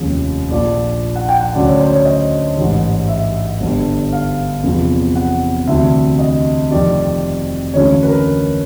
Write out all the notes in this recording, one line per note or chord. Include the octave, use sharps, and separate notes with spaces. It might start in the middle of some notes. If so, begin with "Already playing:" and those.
Already playing: F1 D#2 C#3 F3 G#3
A#1 A#2 F3 D5
F#5
G5
F#5
D2 C#3 F#3 D5
C#5
C5
C#5
D#5
A1 G#2 E3 G3
E5
G1 G2 D3 G3
F5
E2 C3 F3
F#5
D2 C3 E3 E5
D#5
F1 F2 C3 D#3 G3 D5
D2 C#3 E3 G#3 C#5
B4
A#4